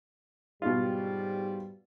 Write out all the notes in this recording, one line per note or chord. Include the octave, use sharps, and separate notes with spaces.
G#2 B2 G3 F4